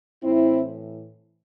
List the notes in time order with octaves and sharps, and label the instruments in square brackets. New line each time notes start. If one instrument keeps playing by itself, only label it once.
[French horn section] A2 E3 C4 E4